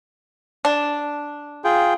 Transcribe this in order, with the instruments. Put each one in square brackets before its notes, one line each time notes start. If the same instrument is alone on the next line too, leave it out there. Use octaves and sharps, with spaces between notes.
[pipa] D4
[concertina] F4 G#4 G5